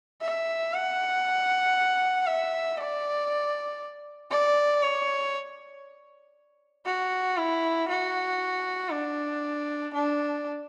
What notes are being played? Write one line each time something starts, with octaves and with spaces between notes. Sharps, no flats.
E5
F#5
E5
D5
D5
C#5
F#4
E4
F#4
D4
D4